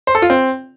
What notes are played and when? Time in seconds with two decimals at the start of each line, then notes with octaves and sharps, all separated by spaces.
0.07 C5
0.15 A4
0.22 F4
0.30 C4